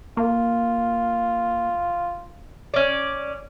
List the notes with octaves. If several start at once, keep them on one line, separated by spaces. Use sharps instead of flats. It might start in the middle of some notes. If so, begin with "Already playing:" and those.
A#3 F4
C#4 D5